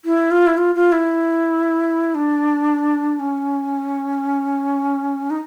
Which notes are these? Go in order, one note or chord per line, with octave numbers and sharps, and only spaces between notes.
E4
F4
E4
F4
F4
E4
D4
C#4
D#4